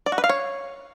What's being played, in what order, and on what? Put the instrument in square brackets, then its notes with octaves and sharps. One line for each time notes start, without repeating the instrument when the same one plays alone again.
[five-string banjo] D5
F#4
B4
F5
C#5